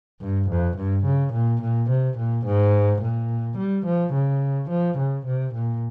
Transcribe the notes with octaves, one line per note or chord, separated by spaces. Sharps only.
G2
F2
G2
C#3
A#2
A#2
C3
A#2
G#2
A#2
G3
F3
C#3
F3
C#3
C3
A#2